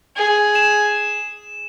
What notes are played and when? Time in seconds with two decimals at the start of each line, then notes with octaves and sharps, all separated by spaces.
0.16 G#4
0.55 E7